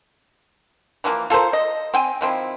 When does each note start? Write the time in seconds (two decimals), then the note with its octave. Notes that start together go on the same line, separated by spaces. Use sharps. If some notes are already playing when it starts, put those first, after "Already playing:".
1.04 E3 F3 G3 A#3
1.30 F4 A4 A#4 C5
1.53 D#5
1.94 C4 G5 G#5
2.21 D#3 F3 C4 E4